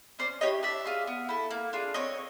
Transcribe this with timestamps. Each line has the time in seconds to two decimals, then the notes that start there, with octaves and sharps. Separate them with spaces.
0.19 C#4 C5 D5
0.41 E4 G4 C#5 D#5
0.63 D4 D5 E5
0.85 F4 G#4
1.07 B3
1.29 E4 A4
1.51 A#3
1.73 D4 F4 G#4
1.94 C4 C#5 D#5